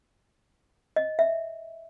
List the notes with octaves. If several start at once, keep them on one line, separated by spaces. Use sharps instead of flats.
D#5
E5